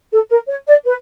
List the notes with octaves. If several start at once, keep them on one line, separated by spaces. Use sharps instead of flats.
A4
A#4
C#5
D5
B4